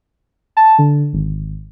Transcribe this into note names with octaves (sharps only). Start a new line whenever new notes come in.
A5
D3
G#1